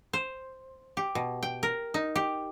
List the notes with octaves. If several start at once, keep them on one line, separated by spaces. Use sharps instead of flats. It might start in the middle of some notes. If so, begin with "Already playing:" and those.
C5
G4
B2
G5
A#4
D#4
G4